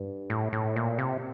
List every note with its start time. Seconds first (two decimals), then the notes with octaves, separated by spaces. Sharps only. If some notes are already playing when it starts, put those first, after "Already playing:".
Already playing: G2
0.30 A2
0.53 A2
0.76 A#2
0.98 C3